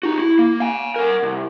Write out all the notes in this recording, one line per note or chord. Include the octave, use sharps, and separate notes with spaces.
D#4 F#4
E4
A#3
F5 G#5
A#4 F#5
C2